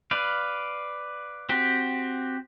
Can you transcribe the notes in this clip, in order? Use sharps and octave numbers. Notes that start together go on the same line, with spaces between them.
B4 D5 F5
C4 F#4 G4